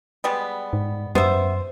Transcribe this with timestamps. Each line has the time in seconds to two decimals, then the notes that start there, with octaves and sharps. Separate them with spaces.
0.24 G3 G#3 B3
0.73 G#2
1.15 F#2 B3 C5 E5